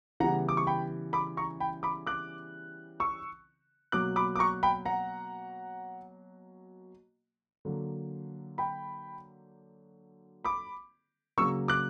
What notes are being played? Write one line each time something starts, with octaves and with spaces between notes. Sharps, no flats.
C#3 E3 G3 B3 F#5 A#5
D6
C#6
G5 B5
B5 D6
A#5 C#6
G5 B5
B5 D6
D6 F#6
C#6 E6
B2 F#3 A#3 D6 F#6
B5 D6
D6
A#5 C#6
G5 B5
F#5 A#5
D3 F#3 A#3
G5 B5
B5 D6
C#3 F#3 A#3 C#6 E6
D6 F#6